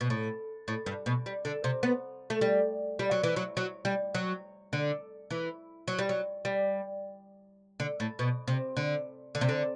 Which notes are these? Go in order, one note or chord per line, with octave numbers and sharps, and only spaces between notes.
B2
A2
A2
G2
B2
G3
D3
C3
B3
A3
G3
G3
F#3
E3
F#3
F#3
G3
F#3
D3
E3
F#3
G3
F#3
G3
D3
A2
B2
C3
D3
D3
C3
D3